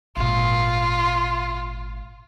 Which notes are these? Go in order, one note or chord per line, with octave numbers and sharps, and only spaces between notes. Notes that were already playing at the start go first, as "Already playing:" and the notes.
G#1 A#2 F4